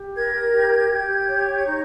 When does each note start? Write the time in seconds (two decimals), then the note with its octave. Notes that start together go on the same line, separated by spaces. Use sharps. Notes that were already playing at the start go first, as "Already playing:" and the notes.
Already playing: G4
0.14 A#4 G#6
0.52 G4
0.90 G4
1.27 C#5
1.56 G#6
1.65 D#4 G6